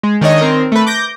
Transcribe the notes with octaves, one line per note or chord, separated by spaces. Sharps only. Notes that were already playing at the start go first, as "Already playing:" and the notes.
G#3
D#3 D4 C#5 D#5
D#3 C4 A#4
A3 B4
D6 G6 A#6